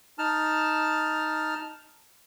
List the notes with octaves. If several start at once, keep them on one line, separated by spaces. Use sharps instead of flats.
D#4 A5 F6